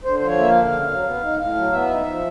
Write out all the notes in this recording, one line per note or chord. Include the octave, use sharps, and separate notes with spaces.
D3 C5
F3 C5
C#5
A#3 E5
F5
D3
C#3
F#3
B3
D#4
A2 F5
F#3
B3 E5
D#4
F3